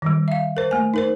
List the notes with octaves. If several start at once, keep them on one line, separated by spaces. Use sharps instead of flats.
D#3 F3 G3
E5 F5
A#4 C5
A3 A#3 G#5
D#4 A#4 C5